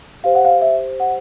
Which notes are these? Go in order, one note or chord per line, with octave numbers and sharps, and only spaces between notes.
G4 C5 F5
F#5
F5
E5
F#5